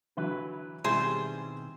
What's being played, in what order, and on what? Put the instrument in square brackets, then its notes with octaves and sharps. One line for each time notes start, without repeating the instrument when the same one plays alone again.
[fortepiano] D3 E3 F#3 [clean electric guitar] B4
[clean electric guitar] B2 D#3 C4 [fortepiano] G3 G#3 E4 [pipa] G#4 C5